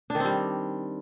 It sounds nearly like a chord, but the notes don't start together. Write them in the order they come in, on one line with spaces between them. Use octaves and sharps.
D4 D#3 C4 G3